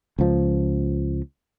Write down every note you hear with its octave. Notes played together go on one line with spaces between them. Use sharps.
C#2 F3